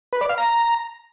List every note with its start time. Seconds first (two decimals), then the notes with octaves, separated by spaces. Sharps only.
0.13 B4
0.21 D5
0.29 F5
0.38 A#5